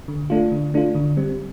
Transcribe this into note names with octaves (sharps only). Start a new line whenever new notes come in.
D3
A3 D4 F4
D3
A3 D4 F4
D3
G3 C4